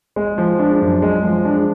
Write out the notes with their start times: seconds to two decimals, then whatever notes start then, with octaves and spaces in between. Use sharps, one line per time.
0.16 G#3
0.38 F3
0.59 D4
0.81 F#2
1.02 G#3
1.24 F3
1.45 D4